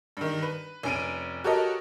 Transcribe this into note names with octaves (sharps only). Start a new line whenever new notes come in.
G2 D#3
B4
F1 C#4 D7 D#7
F#4 G4 A4 A#4 C#5 D#5